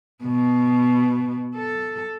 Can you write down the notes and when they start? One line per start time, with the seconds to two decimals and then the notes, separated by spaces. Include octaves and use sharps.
0.24 B2
1.56 A4